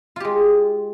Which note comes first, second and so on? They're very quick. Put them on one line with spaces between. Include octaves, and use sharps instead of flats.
F4 G4 G#3